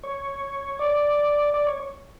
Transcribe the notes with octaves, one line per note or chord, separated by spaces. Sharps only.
C#5
D5
D5
C#5